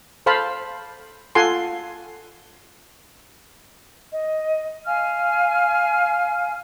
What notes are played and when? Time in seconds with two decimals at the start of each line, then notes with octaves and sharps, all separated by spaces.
0.26 A4 C5 F5 A5 B5
1.35 F4 A4 F#5 G#5 C6
4.12 D#5
4.86 F5 G#5 F6